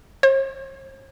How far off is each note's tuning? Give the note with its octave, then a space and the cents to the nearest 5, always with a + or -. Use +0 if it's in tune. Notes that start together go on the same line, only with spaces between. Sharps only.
C5 +45